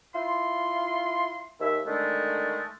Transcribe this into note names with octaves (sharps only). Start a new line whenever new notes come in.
E4 F4 C6
D#2 D#3 E5
D3 D#3 G#3 A3